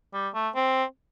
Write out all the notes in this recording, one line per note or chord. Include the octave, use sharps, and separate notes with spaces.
G3
A3
C4